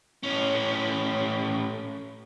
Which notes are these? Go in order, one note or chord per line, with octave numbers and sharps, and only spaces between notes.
A2 C#4